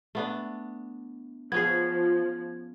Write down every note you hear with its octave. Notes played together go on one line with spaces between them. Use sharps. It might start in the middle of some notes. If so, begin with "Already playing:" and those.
A3 B3 D4
F3 B3 C#4 G#4 G#6